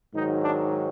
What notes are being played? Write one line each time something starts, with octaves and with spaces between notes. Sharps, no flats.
G#2 D#3 F#3 D#4
D4